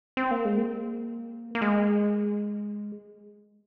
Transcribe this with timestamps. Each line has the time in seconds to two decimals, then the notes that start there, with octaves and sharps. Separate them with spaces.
0.17 C4
0.31 A#3
0.45 G#3
0.58 A#3
1.55 A#3
1.62 G#3